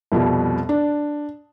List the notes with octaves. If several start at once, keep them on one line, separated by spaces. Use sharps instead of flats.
C2 F2 B2 G3
D4